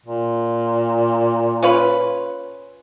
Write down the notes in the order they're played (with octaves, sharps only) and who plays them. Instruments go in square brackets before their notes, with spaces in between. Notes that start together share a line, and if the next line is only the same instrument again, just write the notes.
[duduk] A#2
[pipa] C#4 F4 B4